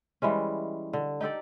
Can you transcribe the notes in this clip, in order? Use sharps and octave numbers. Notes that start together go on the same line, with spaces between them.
E3 G3 G#3 C#4
D3
D#4 G4 A4 D5